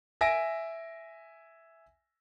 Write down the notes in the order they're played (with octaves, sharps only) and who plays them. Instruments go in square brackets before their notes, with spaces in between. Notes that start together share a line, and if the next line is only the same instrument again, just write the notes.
[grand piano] E5 G#5 A#6 D7